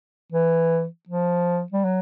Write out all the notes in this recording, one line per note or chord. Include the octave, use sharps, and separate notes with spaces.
E3
F3
G3
F#3